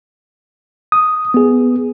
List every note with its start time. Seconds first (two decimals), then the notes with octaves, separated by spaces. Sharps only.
0.92 D#6
1.34 B3 G#4